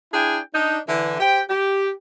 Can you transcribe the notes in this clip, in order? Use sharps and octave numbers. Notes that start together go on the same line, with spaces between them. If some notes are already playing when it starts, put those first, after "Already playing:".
D4 E4 G#4 G5 G#5
D4 D#4
D3 E3
G4 C5 G5
G4